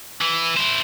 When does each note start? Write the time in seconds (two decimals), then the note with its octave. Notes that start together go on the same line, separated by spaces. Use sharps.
0.21 E3
0.57 E4 C5